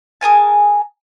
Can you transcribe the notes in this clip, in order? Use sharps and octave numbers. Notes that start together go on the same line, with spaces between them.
G#4 A#4 G#5 A5